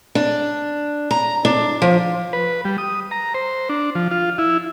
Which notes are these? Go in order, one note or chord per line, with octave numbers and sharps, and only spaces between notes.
D4
A#5
D4
F3
B4
G3
D#6
A#5
C5
D4
F3
F4
E4